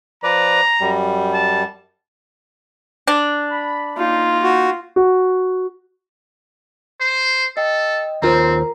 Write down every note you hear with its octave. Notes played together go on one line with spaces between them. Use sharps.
F3 B4 D5 A#5
F#2 G3
A5
D4
B5
A#3 D#4 F4
F#4
F#4
C5
A4 D#5 G5
D#2 C4 F4 A#4 C5 A#5